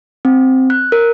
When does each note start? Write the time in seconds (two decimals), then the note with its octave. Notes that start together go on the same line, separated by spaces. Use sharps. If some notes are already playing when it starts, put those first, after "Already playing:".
0.25 C4
0.70 F#6
0.92 A#4